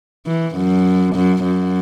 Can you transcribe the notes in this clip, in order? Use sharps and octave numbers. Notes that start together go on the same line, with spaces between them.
E3
F#2
F#2
F#2